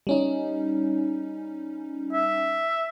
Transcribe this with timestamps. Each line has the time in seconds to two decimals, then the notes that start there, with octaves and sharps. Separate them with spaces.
0.07 G3 C#4 D#4
2.13 E5